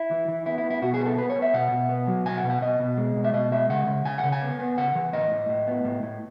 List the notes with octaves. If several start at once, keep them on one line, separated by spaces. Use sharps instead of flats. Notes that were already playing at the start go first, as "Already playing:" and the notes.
Already playing: E4
E3
E3
B3 E4
E4
B3
E4
B2 F#4
G#4
B3
A4
B3 B4
C#5
B3
E5
B2 F#5
B2
B3
F#3
B2 G#5
F#5
B2
F#5
B2 D#5
B2
G#3
B2
E5
B2 D#5
G#3 E5
C#3 F#5
C#3
C#3 G#5
F#5
C#3
G#5
B3
B3
C#3 F#5
E3
A2 D#5
A2
A2
B3
A2
A2